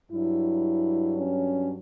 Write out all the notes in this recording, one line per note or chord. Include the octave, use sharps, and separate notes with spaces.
G2 F#3 E4
C#4